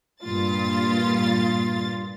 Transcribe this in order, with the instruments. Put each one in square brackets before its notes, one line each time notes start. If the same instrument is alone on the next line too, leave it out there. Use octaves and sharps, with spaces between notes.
[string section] G2 A#2 F4 A6